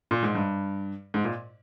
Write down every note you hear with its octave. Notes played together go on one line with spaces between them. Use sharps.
A#2
G#2
G2
G#2
A#2